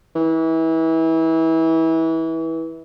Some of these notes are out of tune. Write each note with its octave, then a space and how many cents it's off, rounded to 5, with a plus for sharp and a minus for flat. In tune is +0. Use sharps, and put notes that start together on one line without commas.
E3 -25